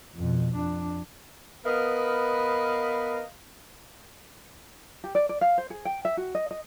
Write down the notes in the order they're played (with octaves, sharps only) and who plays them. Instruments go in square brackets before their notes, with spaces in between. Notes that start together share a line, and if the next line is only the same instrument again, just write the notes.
[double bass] F2 B2
F2 D4
[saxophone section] B3 A#4 B4 D#5 F5
[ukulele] G4
D5
D5
F5
C5
G#4
G5
E5
F#4
D#5
D#5